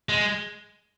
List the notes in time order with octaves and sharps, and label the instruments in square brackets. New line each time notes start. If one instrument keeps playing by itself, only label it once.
[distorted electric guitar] G#3